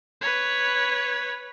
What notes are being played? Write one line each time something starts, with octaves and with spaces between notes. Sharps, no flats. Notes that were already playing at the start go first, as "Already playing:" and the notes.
B4 C#5